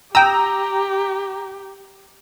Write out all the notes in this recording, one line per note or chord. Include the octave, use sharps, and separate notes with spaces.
G4 G5 A#5 D#6 E6